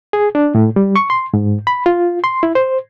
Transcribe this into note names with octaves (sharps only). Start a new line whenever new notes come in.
G#4
D4
A2
G3
C#6
C6
G#2
B5
F4
C6
E4
C5